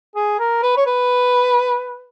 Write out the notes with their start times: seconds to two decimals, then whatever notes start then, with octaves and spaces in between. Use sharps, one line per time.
0.16 G#4
0.39 A#4
0.63 B4
0.77 C#5
0.87 B4